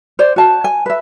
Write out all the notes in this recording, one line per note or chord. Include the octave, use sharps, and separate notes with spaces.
C5 D5
F#4 A5
G#5
B4 E5